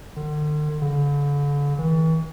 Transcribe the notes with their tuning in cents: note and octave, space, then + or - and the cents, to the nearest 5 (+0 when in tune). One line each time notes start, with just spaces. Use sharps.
D3 +40
D3 -40
E3 -40